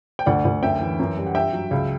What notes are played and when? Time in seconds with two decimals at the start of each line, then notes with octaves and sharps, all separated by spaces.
0.19 G5
0.26 D2 D5 F#5
0.45 D2
0.62 F#2 E5 G5
0.81 E3
0.99 F#2
1.17 G3
1.26 F#5
1.35 G2 E5 G5
1.53 F#3
1.71 C#2